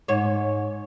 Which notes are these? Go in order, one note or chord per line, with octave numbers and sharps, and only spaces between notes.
G#2 C#5